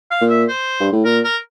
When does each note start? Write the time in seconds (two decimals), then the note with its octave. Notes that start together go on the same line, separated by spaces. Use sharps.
0.11 F5
0.21 A#2
0.29 E5
0.48 C5
0.80 G2
0.93 A2
1.05 A#2 A#4
1.24 A#4